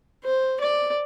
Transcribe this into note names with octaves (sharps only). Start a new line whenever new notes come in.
C5
D5